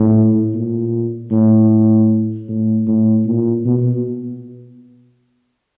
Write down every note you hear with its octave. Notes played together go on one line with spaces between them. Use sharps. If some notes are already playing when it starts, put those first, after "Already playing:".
Already playing: A2
A#2
A2
A2
A2
A#2
B2